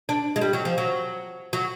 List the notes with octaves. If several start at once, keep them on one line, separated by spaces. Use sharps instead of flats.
D4
G#3
G3
F#3
F3
F#3
F#3